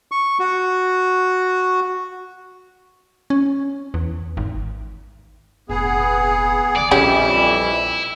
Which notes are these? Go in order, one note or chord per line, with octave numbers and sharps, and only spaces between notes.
C#6
F#4
C#4
E2
G#1
F1 A#1 B3 G#4
D3 E3 D5
A#1 F2 E3 G3 C#4 E4 G4 G#4